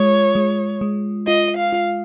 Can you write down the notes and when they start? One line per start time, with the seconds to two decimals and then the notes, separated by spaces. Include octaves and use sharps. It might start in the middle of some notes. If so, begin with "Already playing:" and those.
Already playing: G#3 F4 C#5
0.35 G#3
0.81 G#3
1.27 F4 D#5
1.57 F5
1.73 F4